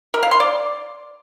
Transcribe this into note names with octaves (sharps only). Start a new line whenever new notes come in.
A#4
F5
C6
D5